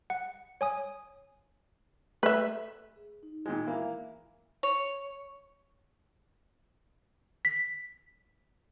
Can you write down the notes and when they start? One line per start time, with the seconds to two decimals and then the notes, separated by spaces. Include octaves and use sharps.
0.10 F#5
0.61 C#5 G#5 D#6
2.23 A3 A4 B4 E5 B6
2.96 G#4
3.23 D#4
3.46 A#2 D#3 G#3
3.67 E3 A#3 E5 F5
4.63 C#5
7.45 B6